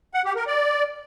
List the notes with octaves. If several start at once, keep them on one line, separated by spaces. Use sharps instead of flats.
F#5
G4
A#4
D5